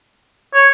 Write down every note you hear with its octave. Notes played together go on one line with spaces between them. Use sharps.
C#5